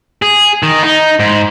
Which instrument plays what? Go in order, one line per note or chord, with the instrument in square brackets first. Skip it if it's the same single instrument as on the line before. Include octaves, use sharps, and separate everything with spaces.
[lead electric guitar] G#4
D#3
D#4
G#2